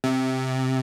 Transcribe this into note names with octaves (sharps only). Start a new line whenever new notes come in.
C3